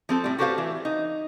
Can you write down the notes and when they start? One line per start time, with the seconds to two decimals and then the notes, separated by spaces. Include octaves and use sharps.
0.09 F3 C4 A4
0.24 A2 G3
0.38 F#4 G4 A4 B4 C5 F5
0.58 E3
0.85 D#4